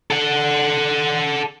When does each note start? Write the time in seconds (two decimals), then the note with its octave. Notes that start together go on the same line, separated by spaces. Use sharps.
0.11 A4 F#5